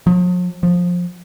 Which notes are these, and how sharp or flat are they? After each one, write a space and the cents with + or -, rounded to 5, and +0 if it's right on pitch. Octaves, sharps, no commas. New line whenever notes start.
F3 +45
F3 +15